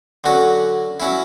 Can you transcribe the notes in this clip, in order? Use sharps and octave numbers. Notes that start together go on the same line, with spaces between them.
D3 F#3 C#4 F#4
F#3 C#4 E4